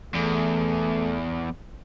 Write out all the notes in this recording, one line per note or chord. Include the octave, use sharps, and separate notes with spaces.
E2 A3